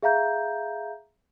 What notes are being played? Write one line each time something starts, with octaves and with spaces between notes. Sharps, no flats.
G#4 E5 F5 A#5 G6